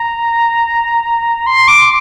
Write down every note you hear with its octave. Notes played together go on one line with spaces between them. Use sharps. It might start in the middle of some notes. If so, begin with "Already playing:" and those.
Already playing: A#5
C6
D6